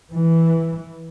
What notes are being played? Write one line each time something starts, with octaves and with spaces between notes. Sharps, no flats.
E3